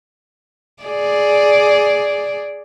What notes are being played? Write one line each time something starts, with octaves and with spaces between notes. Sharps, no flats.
G#4 D5